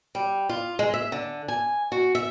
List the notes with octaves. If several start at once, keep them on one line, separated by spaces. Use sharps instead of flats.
G3
F4
G#3
E5
D3
G#5
F#4
E5